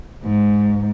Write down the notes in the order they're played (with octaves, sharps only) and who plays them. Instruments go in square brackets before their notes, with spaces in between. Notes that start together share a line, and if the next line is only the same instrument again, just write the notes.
[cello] G#2